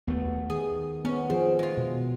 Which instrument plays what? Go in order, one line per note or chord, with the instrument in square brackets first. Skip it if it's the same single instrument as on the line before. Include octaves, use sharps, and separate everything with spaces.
[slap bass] D#2 A3 [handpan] B3
[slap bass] D#3 [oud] G#4
[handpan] B3 [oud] C#4
[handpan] F3 G#4 [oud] C4
[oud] G#3 F4
[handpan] B2